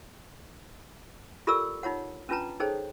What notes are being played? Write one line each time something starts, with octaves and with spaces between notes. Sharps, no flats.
F4 G4 A4 A#4 D5 E6
D#4 F4 C#5 F#5
C#4 D4 F4 B4 A5 A#5
D#4 G#4 A4 C5 C#5 G5